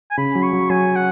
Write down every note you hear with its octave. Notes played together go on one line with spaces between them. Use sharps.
G#5
C#3 B5
F#3
C#6
F#3
F#3 G#5
F#5